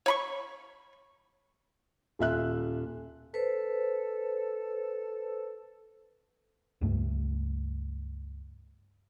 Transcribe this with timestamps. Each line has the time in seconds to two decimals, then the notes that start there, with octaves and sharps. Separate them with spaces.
0.06 C#5 B5 C#6
2.19 D#1 F4 E5 F#6
3.34 A4 B4 C5
6.81 C#2 G2 A3